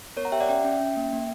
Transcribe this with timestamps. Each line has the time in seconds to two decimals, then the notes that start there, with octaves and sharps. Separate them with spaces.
0.17 B3 A#4 C#5
0.25 F#5 A#5
0.32 G4 E5 G5
0.40 D5 F#5
0.49 C#4 E5 G5
0.64 C#4
0.81 C#4
0.97 A#3
1.13 A#3